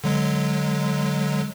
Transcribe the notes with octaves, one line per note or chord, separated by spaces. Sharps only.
D3 F#3 G#3